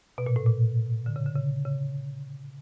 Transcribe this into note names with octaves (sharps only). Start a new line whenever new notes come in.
B2
A#2
A2
A#2
D3
C#3
D3
C#3
C#3